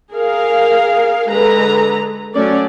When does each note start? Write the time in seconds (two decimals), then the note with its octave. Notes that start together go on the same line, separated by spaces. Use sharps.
0.13 G#4 A#4 F5
1.30 D3 G#3 B4 A#5
2.34 F#3 A3 C#4 D5